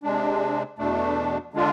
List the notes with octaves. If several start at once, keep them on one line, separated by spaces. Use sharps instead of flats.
C3 G#3 D4
E2 B2 A3 D4
D3 G#3 D4 F4